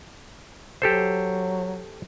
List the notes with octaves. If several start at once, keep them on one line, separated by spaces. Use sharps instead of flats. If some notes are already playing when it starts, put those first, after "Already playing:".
F#3 G4 A4 C5